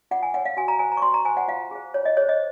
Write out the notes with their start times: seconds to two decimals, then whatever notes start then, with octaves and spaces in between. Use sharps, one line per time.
0.11 F4 F#5
0.23 G#5
0.34 A#4 C#5 F#5
0.45 F5
0.57 F#4 G#5
0.68 A#5
0.79 C5 G#5
0.92 A#5
0.97 C#6
1.02 F#4 C6
1.14 A#5
1.25 C5 G#5
1.37 F#5
1.48 F4 F5
1.71 G#4 C5
1.94 F4 C#5
2.05 D#5
2.17 G#4 C5 C#5
2.29 D#5